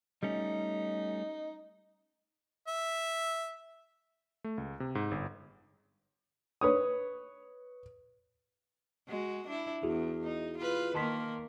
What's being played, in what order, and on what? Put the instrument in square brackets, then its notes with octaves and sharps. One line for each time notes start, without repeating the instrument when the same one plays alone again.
[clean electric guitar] G3 A3 C#4 [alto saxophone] D#4
[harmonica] E5
[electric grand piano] A3
C#2
C3
G#2
G1
[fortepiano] B4 C#5 D#6
[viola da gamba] G#3 F#4
D4 E4
[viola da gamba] E2 [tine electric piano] E4 F#4 G#4
[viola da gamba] D#4
F4 B4
[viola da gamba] D#3 A#3 [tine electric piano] A5 C6 B6